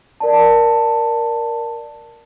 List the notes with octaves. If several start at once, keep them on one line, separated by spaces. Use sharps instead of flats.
A#4 D5 A5